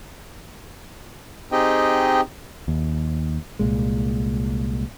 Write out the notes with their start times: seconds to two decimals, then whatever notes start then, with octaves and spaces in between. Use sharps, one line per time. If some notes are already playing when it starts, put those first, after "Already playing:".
1.52 C4 D#4 G4 G#4 D#5 G5
2.68 D#2
3.59 C2 A#2 G#3